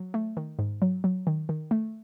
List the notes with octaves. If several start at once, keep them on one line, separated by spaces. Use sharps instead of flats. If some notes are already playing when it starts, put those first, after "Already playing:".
Already playing: F#3
A3
D#3
G#2
F#3
F#3
D#3
D#3
A3